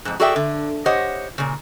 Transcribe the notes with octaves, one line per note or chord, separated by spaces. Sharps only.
F2 G#2
F#4 G#4 A4 D5 E5 G5
D3
G4 C5 C#5 D#5 F#5
A#2 C#3